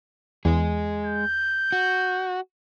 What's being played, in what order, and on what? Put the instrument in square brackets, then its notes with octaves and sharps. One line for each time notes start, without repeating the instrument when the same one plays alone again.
[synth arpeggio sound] E2 [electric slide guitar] G#3 G#4
[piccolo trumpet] G6
[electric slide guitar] F#4